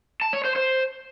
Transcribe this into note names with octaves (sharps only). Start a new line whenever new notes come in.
A5
C#5
C5
C5